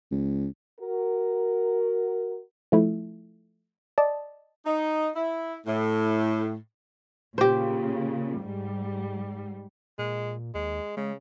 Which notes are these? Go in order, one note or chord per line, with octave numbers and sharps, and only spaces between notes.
C#2
F#4 A#4
F3 A3 E4
D5 D#5 A5
D#4
E4
A2
A#2 C#3 G4 C5
G#2 G3
A#2 G#3
D#2 G#3
C#3 G#3